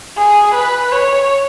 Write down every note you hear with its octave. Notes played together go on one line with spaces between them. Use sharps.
G#4
B4
C#5